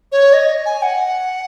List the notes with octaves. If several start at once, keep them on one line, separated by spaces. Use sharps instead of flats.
C#5
D#5
G#5
F#5